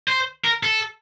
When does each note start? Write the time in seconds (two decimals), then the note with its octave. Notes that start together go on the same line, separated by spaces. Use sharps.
0.08 C5
0.44 A#4
0.63 A4